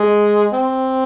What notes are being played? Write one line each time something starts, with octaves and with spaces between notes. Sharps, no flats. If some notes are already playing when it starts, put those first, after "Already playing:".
Already playing: G#3
C4